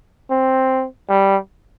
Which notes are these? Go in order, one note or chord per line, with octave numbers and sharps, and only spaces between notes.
C4
G3